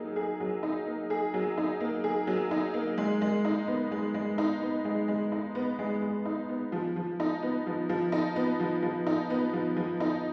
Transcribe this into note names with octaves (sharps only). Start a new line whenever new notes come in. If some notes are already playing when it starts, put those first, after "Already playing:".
Already playing: F#3 A#3 D#4 G#4
G#4
F#3
D#4
A#3
G#4
F#3
D#4
A#3
G#4
F#3
D#4
A#3
G#3
G#3
D#4
B3
G#3
G#3
D#4
B3
G#3
G#3
D#4
B3
G#3
G#3
D#4
B3
F3
F3
D#4
B3
F3
F3
D#4
B3
F3
F3
D#4
B3
F3
F3
D#4